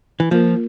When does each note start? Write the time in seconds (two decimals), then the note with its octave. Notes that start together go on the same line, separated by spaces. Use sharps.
0.20 E3
0.31 F3 A#3 F4 A#4